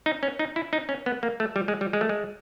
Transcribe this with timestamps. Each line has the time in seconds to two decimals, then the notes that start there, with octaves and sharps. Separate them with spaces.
0.06 D#4
0.23 C#4
0.39 D#4
0.56 E4
0.73 D#4
0.89 C#4
1.06 B3
1.23 A#3
1.40 A3
1.56 G3
1.68 G#3
1.81 G3
1.93 G#3
2.01 A3
2.09 G#3